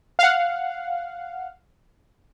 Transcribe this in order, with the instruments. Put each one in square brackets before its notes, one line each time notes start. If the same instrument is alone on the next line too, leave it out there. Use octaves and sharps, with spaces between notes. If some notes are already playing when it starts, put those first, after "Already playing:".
[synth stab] F5 F#5